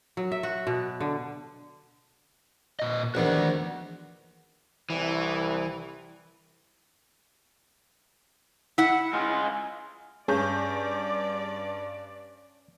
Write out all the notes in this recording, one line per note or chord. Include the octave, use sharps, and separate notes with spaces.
F#3
E5
F#4
B2
D3
A#2 D#5
A#1 E2 D#3 F#4 D5 F#5
C2 E3
E4 F#5
G#3 F4
G2 C#4 G#4 D5 G6